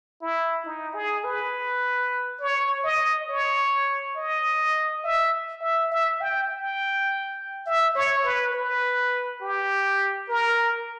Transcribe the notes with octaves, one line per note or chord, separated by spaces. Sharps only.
E4
D#4
G#4
B4
C#5
D#5
C#5
D#5
E5
E5
E5
G5
G5
E5
C#5
B4
B4
G4
A#4